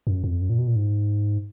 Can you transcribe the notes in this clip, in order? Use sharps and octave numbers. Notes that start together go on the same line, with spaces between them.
F#2
F2
F#2
A#2
B2
A#2
G#2